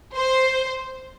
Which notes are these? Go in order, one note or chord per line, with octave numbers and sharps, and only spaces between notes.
C5